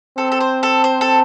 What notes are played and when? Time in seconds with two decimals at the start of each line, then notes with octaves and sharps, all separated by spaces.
0.18 C4 A4
0.32 A4
0.40 C5
0.63 A4
0.84 C5
1.01 A4